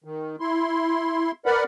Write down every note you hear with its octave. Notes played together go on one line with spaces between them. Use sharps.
D#3
E4 C6
A#4 B4 D5 F#5 B5